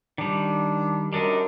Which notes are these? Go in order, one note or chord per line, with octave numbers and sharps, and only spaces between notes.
D#3 G3 D4
F#2 G3 D4 D#4